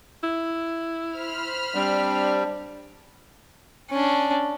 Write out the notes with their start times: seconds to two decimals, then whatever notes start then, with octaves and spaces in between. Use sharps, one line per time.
0.23 E4
1.16 C5 B5 F6
1.75 G3 C4 D4
3.90 C#4 D4